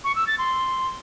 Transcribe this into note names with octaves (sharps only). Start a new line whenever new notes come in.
C#6
E6
A6
C6